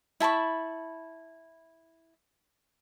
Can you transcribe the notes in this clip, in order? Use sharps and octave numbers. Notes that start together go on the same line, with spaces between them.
E4 A5 B5 C#6